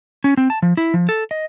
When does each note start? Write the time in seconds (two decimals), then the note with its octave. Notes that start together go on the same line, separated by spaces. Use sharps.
0.24 C#4
0.37 C4
0.50 A5
0.62 F3
0.77 E4
0.94 F3
1.09 A4
1.31 D#5